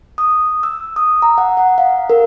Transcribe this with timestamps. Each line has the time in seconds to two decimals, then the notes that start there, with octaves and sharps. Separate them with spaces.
0.18 D#6
0.63 E6
0.96 D#6
1.22 A#5
1.38 F#5
1.57 F#5
1.78 F5
2.10 A#4